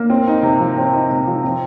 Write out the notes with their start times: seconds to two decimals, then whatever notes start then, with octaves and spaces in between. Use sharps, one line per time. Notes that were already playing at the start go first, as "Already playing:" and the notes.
Already playing: A#3
0.10 C4
0.27 D#4
0.43 C3
0.60 F3
0.77 C4
0.93 D#4
1.11 C3
1.27 F3
1.44 C4